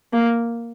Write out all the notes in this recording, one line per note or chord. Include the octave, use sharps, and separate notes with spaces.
A#3